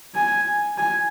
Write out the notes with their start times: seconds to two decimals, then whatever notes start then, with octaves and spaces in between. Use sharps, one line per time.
0.15 G#5
0.77 G#5